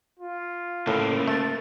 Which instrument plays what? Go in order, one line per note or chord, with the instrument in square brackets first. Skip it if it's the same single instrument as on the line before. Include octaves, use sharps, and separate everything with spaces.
[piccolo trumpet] F4
[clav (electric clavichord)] A2 [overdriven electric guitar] C#3 A#3 [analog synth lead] A4
[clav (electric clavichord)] A3 [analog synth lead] A6